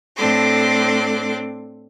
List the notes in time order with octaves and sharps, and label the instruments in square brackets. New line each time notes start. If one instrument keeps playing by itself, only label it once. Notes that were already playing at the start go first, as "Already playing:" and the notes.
[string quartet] A2 C4 D4 A4 C6 D6